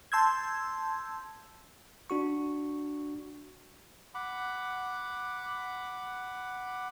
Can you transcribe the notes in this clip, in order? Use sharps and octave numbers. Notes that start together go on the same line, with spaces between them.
A5 C6 E6 G6 G#6
D4 F#4 C#6
F#5 B5 D6